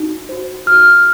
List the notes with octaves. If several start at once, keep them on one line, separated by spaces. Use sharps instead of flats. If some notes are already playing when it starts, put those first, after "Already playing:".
Already playing: D#4 F#4
F#4 C5
F#4 F6